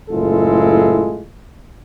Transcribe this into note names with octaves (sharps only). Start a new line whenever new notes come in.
F#1 A2 G#3 E4 F4 A4